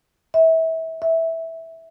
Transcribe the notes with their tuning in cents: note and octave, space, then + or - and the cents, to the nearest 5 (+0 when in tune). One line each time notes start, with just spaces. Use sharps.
E5 -25
E5 -10